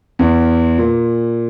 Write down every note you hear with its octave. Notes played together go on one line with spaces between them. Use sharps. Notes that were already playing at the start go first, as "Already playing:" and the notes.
E2
A#2